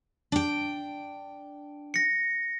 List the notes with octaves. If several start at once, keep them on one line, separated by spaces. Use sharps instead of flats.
D4 G5
A#6 C#7